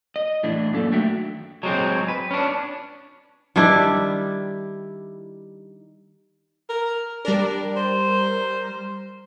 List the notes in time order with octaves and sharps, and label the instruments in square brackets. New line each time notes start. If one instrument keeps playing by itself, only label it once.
[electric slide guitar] D#5
A2 E3 D4
F#2 A#3 A4
D#3 A3 D4 F#4 E5 G5
[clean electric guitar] F#3 G#3 C4
B4
C#4 D4
[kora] D#3 G3 D4 E4
[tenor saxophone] A#4
[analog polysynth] G3 A#4 [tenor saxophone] D4
[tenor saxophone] C5